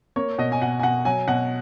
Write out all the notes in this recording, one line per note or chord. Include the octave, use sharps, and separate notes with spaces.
A#3 C#5
B2 D#5
G#5
B2 F#5
G#5
B2 F#5
F#3 G#5
B2 F#5